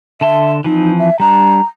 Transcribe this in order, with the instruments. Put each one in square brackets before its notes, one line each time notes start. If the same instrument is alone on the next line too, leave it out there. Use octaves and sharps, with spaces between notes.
[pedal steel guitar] D3 A5 C6 [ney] E5
[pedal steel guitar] E3 F3 C4 [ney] D#4
[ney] E5
[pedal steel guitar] G3 D4 [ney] A#5